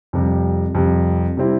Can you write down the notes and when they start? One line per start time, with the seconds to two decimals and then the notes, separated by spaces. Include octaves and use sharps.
0.13 F2 C3 G3
0.75 F2 C3 G3
1.37 C3 G3 C4 E4